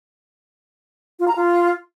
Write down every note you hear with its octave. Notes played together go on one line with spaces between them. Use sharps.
F4
A#5
F4